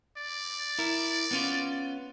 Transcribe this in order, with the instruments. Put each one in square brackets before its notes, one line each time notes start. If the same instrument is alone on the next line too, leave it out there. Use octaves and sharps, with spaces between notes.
[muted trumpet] D5
[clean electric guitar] E4 A#4
B3 C#4 F4